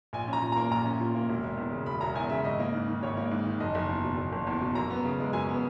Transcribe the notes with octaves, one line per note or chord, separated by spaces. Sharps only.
A#1 G#5
C#4 A#5
A#2
A#3 A#5
A#1 A#5
C#4
A#2
A#3
E1
E1
E2
C#3
E1 B5
E1 A#5
E2 G#5
C#3 E5
G#1 D#5
A#3
G#2
D#3
G#1 C#5
A#3
G#2
D#3
F#1 D#5
F#1
E2
B2
F#1
F#1
E2
B2
F#2 A#5
B3
C#3
G#3
F#2 G#5
B3